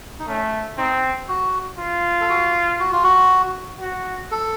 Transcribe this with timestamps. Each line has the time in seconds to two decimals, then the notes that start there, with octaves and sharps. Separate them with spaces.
0.19 D#4
0.27 A3 C#4
0.78 C4 D#4
1.28 F#4
1.79 F4
2.20 A4
2.29 F#4
2.79 F#4
2.92 F4
3.04 F#4
3.80 F#4
4.32 A4